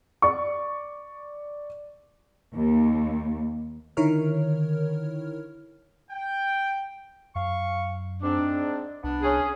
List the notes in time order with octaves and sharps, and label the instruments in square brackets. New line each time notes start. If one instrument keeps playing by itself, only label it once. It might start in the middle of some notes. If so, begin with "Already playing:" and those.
[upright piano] D5 C#6
[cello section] D#2
[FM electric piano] D3 D#3 E4 A#4 C#5 F6
[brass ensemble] G5
[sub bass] F#2 [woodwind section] F5 C#6
[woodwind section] G#2 C4 [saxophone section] D4
[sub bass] C2 [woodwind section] B3 D4
[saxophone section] C#4 G#4